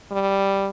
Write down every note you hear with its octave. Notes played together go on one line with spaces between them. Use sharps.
G3